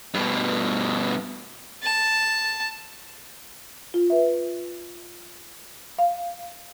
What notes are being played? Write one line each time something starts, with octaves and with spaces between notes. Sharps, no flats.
G2 B2
A5
F4
B4 E5
F5